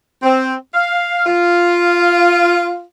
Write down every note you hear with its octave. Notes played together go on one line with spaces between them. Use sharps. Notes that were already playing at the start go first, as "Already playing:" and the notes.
C4
F5
F4